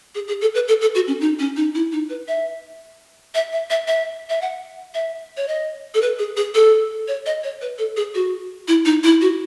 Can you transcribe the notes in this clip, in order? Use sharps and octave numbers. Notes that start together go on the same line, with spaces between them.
G#4
G#4
A4
B4
A4
A4
F#4
C#4
D#4
C#4
D#4
E4
D#4
B4
E5
E5
E5
E5
E5
E5
F#5
E5
C#5
D#5
A4
B4
G#4
G#4
A4
C#5
D#5
C#5
B4
A4
G#4
F#4
E4
D#4
E4
F#4